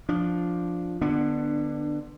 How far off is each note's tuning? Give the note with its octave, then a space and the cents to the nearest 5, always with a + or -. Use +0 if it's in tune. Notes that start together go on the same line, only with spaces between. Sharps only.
F3 +5 D4 +0
D3 +25 B3 +0 D4 +10